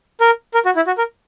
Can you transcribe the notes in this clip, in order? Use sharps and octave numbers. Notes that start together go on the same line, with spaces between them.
A#4
A#4
F#4
E4
F#4
A#4